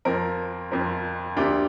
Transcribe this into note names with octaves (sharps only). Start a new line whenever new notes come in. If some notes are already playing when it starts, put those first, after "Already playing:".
F2 F3 C4 A#4
F2 F3 C4 A#4
D2 D3 A#3 D4 G4